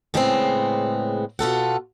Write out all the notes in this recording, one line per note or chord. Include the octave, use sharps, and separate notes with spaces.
A2 C#3 G3 G#3 B3 C4
B2 F4 A4 F#5